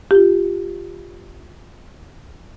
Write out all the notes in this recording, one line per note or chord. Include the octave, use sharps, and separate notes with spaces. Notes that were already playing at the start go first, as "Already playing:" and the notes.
F4 G4